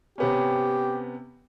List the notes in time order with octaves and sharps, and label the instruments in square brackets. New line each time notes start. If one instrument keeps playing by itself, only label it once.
[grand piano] C3 B3 C#4 [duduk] G4